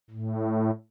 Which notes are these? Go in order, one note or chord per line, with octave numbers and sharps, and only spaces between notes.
A2